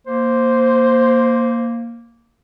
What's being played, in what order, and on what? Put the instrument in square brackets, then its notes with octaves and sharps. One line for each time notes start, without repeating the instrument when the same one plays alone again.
[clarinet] A#3 [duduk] C5